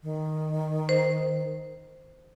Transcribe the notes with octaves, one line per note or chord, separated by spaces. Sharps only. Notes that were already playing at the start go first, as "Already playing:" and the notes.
D#3
C5